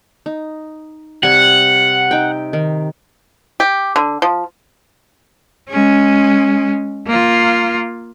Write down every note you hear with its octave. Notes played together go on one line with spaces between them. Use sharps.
D#4
C3 G3 F#5 G#5
D#4 G5
D#3
G4
D3
F3
G#3 C#4
A#3 F4